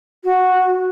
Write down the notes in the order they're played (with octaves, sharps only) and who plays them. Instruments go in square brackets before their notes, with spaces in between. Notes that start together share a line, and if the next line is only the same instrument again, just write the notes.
[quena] F#4